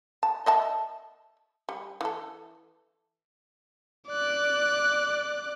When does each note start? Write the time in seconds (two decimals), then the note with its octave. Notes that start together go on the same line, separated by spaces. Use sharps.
0.23 A5
0.46 D#5 E5 A5
1.69 G3
2.01 E3 A4
4.09 D5 F#6